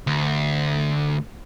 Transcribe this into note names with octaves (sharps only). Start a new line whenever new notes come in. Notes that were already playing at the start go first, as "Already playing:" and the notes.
D2